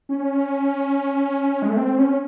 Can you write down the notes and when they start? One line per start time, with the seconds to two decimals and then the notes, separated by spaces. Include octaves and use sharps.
0.09 C#4
1.62 G#3
1.70 A3
1.77 C4
1.98 C#4